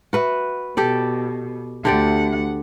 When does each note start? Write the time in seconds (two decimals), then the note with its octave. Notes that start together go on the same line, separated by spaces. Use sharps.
0.13 F#4 B4 E5
0.77 B2 G4 A4 D5
1.85 D2 D3 G4 D5 F#5